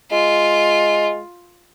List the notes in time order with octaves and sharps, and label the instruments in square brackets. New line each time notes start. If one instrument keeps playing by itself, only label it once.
[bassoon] G#3 [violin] F4